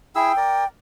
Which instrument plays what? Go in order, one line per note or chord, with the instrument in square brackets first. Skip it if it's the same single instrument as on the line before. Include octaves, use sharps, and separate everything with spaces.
[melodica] E4 G#4 E6 [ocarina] G5
[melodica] A#4 D5